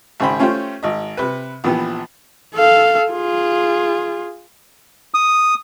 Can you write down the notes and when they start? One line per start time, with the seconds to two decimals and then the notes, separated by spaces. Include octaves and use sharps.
0.20 G#1 C#3 C5 G5 B5
0.39 A3 C#4 F4 G4 C5 G5
0.83 G#1 D#5
1.17 C3 B4
1.64 A#1 A#2 E3 F3 B3 G4
2.55 A4 F5
3.11 F4 G#4
5.14 D#6